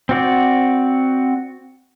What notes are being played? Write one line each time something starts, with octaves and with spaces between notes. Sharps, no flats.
C4 F#4 D5